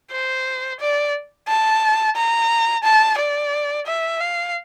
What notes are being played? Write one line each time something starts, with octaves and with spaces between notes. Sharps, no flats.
C5
D5
A5
A#5
A5
D5
E5
F5